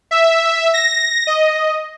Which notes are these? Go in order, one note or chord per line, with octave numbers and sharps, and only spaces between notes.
E5
A#6
D#5